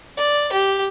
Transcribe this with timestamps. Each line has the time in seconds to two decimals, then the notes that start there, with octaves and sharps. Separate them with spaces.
0.18 D5
0.53 G4